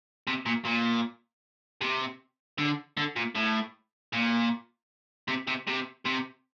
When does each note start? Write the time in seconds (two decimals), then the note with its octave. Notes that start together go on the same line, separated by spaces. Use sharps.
0.27 C3
0.46 A#2
0.65 A#2
1.81 C3
2.58 D3
2.97 D3
3.16 A#2
3.35 A2
4.13 A#2
5.28 C3
5.47 C3
5.67 C3
6.05 C3